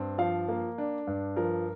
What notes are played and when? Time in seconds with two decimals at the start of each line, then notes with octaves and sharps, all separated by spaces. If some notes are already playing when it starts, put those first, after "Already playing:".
Already playing: G2 C4
0.18 F3 F5
0.48 A#3
0.78 D4
1.07 G2
1.36 F3 A#4